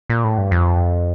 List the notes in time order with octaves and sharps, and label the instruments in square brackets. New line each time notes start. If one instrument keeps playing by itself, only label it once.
[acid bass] A#2
A2
G2
F2